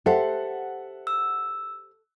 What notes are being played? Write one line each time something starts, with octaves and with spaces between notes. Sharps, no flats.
G4 A4 C5 E5 F#5
E6